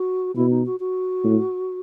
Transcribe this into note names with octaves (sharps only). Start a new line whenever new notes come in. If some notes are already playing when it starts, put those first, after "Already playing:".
Already playing: F#4
B2 E4
D#4
F#4
F#4
A2